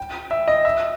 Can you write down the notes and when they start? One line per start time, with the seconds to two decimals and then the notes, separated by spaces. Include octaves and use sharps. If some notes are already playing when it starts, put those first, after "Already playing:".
Already playing: G5
0.31 E5
0.48 D#5
0.65 E5